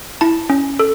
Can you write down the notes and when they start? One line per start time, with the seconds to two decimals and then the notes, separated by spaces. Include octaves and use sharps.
0.21 E4 A5
0.50 C#4
0.79 A4